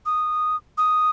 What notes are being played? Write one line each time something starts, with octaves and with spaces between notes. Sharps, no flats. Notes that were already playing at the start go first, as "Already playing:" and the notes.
D#6
D#6